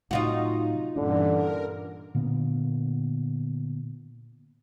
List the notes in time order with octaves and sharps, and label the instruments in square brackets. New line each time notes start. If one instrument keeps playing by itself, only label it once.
[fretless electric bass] A2 C3 F#3 [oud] D#4 F4 F#4
[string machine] G2 A#2 E3 [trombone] D3 [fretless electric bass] C#4 D4
[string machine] A#4
[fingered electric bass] A#2 D3 A#3 B3